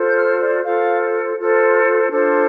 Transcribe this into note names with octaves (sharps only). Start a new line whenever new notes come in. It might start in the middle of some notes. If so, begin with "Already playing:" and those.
Already playing: F4 A4 C5
G6
F6
D5
F4 A4 C5 F5
F4 A4 C5
D4 F4 A4 C5